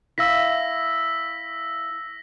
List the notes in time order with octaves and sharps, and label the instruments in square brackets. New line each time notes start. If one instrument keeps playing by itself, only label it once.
[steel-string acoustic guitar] E4 F5 [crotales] E6 A#6 B6